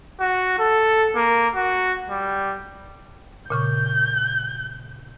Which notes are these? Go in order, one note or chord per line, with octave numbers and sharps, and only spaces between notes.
F#4
A4
A#3
F#4
G3
A#2 C#3 C#6 G6